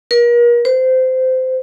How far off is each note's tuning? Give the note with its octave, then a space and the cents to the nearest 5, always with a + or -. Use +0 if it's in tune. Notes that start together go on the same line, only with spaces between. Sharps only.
A#4 +40
C5 -20